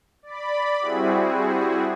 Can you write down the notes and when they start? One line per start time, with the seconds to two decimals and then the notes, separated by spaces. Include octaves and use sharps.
0.23 D5 B5
0.80 G3 C4 E4 F#4 G#4